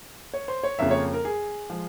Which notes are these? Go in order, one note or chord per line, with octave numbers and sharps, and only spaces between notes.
C#5
C5
C#5
F2 C#3 F3 A#3 E5
C#5
A#4
G#4
F3 G#3